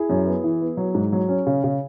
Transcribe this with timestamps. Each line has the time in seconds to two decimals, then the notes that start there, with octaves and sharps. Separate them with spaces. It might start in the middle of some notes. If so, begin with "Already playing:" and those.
Already playing: E4 G#4
0.09 F#2
0.26 B3
0.44 E3
0.61 B3
0.77 F#3
0.95 G#2
1.12 F#3
1.29 C#4
1.47 C#3
1.64 C#3